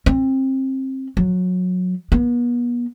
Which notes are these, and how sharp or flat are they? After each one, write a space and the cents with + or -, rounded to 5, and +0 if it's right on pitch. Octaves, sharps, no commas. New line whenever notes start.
C4 +25
F#3 -25
B3 -40